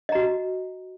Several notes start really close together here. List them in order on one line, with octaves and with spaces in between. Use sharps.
D#5 A#5 F#4